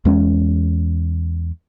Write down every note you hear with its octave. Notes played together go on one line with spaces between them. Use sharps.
E2 G#3 C#4